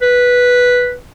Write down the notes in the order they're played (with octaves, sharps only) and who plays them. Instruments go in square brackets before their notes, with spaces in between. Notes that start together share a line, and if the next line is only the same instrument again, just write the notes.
[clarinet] B4